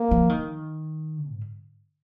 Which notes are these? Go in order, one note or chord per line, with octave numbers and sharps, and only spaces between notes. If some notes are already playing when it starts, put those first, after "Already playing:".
Already playing: A#3
F3
D#3
G#2